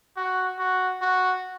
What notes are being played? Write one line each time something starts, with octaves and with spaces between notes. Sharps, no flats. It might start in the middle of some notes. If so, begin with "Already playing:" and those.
F#4
F#4
F#4